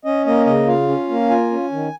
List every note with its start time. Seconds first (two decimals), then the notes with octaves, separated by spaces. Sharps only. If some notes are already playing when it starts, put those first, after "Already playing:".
0.05 C#4 D#5
0.26 A#3 D#5
0.46 C#3 D#5
0.67 F4 F5
0.89 C#4
1.09 A#3
1.30 F4 G#5
1.51 C#4
1.72 D#3